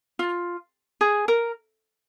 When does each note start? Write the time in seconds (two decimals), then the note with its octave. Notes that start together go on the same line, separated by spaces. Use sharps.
0.19 F4
1.01 G#4
1.28 A#4